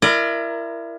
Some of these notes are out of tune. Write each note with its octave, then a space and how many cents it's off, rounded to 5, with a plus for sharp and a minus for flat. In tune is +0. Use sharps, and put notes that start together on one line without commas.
E4 +30 A#4 +0 D5 +35